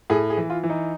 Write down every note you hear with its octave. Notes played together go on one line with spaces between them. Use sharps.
A2 G#4
G#4
E3
F4
E3
D#4